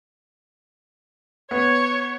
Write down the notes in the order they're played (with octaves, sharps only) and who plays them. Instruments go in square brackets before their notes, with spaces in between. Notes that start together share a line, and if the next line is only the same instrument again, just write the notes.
[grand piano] B3 [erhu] C#5